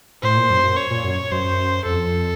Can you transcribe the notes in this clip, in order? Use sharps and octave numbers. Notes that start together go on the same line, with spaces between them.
A2 C5
A#2
F#2
F#2
C#5
A#2
F#2
F#2 C5
F2 A4